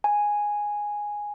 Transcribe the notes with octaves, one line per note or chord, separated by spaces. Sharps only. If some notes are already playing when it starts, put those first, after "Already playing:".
G#5